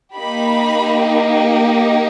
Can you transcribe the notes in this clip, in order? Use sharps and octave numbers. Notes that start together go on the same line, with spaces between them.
A#3 D#4 G4 B5